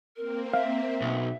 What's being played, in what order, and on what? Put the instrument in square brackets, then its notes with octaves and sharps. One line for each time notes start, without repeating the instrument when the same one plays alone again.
[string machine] A#3 C4 [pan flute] A#4
[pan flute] E5 [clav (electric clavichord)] F5
[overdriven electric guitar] B1